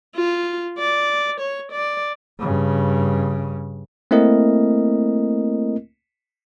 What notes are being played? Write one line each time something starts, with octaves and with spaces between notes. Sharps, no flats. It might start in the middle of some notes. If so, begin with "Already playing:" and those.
F4
D5
C#5
D5
G2 C#3
A3 A#3 C4 E4 A#4 D#5